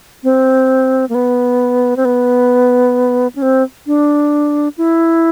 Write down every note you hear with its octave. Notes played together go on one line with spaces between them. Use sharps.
C4
A#3
B3
C4
B3
C#4
C4
D4
E4